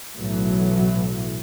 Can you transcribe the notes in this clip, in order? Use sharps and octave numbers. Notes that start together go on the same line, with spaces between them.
B1 A2 E3 F#3